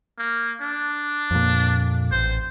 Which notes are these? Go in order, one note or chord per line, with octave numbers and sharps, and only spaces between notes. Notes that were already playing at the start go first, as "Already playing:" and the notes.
A#3
D4
F2 A#2
A1 C5